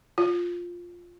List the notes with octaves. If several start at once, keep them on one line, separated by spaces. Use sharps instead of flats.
F4